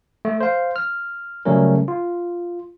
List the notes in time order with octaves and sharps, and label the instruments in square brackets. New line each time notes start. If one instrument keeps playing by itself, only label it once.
[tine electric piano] A3
C5 F5
F6
C#3 F#3 G3 A3 C#4 A#4
F4